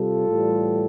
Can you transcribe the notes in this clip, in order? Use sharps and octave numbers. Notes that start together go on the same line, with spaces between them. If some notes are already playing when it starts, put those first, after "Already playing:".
Already playing: C3 G3 F4 A4
A2 E3 G3